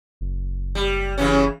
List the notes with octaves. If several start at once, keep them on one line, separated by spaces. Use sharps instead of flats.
F#1
G3
C#3 E3 C#4